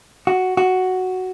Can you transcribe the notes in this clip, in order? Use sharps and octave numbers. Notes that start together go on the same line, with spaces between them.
F#4
F#4